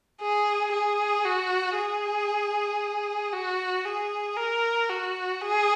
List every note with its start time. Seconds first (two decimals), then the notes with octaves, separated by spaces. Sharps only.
0.21 G#4
0.72 G#4
1.25 F#4
1.76 G#4
3.33 F#4
3.85 G#4
4.37 A#4
4.90 F#4
5.41 G#4